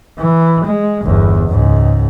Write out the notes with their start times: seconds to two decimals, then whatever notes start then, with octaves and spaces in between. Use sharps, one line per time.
0.19 E3
0.64 G#3
1.03 G1 E2
1.50 C#2 G#2